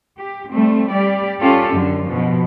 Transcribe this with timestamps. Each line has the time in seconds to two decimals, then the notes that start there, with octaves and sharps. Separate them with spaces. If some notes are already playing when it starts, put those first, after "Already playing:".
0.18 G4
0.52 G3 A3 C4
0.90 G3 G4 D5
1.41 C#4 F4 G4 A4
1.74 F#2 D3
2.04 B2 F3